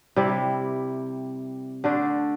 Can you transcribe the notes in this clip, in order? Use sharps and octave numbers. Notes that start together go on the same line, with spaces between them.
C3 G3 E4
D3 A3 D4